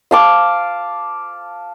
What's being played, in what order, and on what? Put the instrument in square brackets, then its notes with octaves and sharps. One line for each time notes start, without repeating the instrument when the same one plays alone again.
[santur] F5 A5 D6